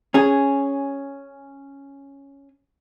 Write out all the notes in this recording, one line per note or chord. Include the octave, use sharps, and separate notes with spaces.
C#4 G#4